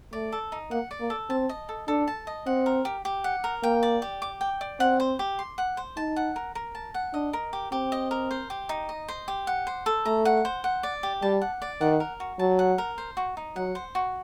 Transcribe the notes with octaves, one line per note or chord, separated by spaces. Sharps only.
A3 D5
A4
D#4
A#3 F#5
D5
A#3
A4
C4 A5
D#5
A4
D4 A4
A5
D#5
C4 F#5
A#4
G4
G4
F#5
A#4
A#3 G5
D5
G4
D6
G5
D5
C4 F#5
C5
G4
C6
F#5
C5
D#4 A5
F#5
A#4
A#4
A5
F#5
D4 D#5
A#4
G4
C4 G4
D#5
A#4
C5
G4
D#4
D#5
C5
G4
F#5
C5
A4
A3 A#5
F#5
C5
F#5
D5
G4
G3 A5
F#5
D5
D#3 F#5
A#4
F#4
F#3 A5
F#5
A#4
C5
F#4
D#4
F#3 F#5
C5
F#4